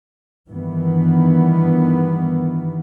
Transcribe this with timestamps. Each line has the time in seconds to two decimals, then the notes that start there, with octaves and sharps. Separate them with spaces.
0.49 G2 D#3 E3 B3